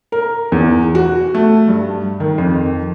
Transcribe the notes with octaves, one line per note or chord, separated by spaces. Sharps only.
A#4
E2
F#4
A3
G2
D#3
F2